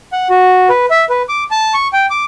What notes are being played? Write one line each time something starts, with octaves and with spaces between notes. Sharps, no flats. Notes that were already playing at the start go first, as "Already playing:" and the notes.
F#5
F#4
B4
E5
B4
D6
A5
C#6
G5
D6